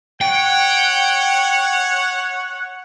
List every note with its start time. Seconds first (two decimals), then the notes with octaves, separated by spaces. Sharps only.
0.21 C#5 F#5 G5